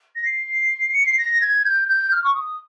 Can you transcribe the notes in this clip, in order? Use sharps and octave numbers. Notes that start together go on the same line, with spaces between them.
A#6
C7
C#7
C7
A#6
G#6
G6
G6
F6
C#6
D#6